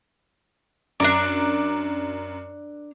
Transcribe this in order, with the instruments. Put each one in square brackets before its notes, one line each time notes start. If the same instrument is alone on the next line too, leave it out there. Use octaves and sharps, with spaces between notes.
[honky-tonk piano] F#2 [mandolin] D4 A#4 D5